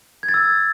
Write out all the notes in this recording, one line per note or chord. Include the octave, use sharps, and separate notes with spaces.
G#6
A6
E6